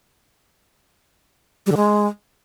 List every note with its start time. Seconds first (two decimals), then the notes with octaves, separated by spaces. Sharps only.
1.66 G3
1.72 D3
1.77 G#3